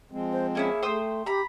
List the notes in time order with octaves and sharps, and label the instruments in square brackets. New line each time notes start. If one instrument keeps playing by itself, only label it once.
[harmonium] F3 G#3 C4
[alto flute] C5
[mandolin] A#3 C#4 E4 [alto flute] G#4
[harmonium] A3 [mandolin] C5 G5 D#6
[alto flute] G4 [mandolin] A#5 B5